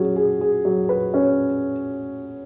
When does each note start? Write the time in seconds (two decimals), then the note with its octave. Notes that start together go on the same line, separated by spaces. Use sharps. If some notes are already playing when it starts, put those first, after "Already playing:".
Already playing: F#3 C#4 G#4
0.16 G#4
0.41 G#4
0.65 F#3
0.89 B4
1.14 C#4